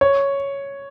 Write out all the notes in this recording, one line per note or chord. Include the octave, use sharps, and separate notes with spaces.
C#5